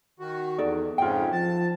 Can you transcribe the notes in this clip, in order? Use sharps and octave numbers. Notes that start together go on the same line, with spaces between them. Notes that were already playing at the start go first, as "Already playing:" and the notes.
D#3 F#4
E2 D#4 A4 D5
F2 G#2 C#3 F4 G5
F3 A5